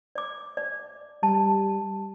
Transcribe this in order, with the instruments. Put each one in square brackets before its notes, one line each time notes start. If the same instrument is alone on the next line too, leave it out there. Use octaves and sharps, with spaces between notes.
[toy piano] D5 D6
D5
[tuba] G3 [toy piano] A5